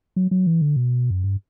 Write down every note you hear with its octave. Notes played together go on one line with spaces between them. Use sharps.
F#3
F#3
E3
D3
B2
F#2
G2